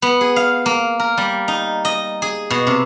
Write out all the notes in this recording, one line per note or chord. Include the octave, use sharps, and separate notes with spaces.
B3
G#4
F5
A#3
A#4
G3
D#4
D#5
G#4
B2
C3